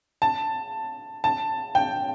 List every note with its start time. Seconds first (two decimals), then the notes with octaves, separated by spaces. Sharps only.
0.22 A5
1.24 A5
1.75 G5